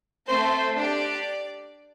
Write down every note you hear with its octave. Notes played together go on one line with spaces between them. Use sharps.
A3 C4 A4 C5
D4 G4 D5